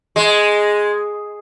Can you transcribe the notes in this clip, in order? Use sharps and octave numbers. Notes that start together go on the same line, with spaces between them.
G#3